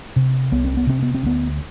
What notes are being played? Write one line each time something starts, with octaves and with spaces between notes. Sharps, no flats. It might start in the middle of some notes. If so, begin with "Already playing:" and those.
C3
C2 B3
C4
B3
C3 C4
B3
C4
D2 B3